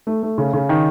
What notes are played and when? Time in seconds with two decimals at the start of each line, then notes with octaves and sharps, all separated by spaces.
0.07 A3
0.23 A3
0.38 C#3
0.53 C#3
0.69 D#3